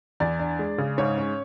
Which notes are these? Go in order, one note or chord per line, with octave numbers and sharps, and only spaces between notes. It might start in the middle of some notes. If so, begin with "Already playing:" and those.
E2 D5
D4
G#3
C#3
G#2 C#5
C#4